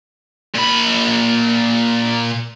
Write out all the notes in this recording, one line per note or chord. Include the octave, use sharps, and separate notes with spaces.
A#2 B5